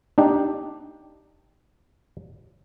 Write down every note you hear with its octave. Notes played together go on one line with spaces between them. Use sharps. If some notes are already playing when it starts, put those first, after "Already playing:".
D4 D#4 G4